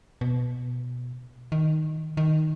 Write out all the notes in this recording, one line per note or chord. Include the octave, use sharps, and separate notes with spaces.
B2
D#3
D#3